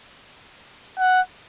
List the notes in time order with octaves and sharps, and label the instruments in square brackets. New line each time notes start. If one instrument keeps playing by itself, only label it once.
[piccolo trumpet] F#5